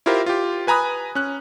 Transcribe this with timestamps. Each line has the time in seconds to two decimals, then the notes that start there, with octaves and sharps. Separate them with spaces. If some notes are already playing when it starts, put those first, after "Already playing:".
0.06 E4 F4 G4 A#4 C5
0.26 F4 G4
0.67 B4 G#5 A#5 B5 D#6 F#6
1.15 C#4 F#6